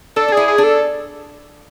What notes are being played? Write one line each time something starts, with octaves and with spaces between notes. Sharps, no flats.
D4 A4
D4
E4 G#4
G#4
D4
A4